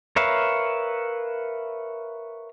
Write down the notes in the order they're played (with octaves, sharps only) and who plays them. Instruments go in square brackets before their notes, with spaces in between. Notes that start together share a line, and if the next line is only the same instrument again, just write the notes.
[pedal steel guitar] A#4 B4 C#5 E5 F5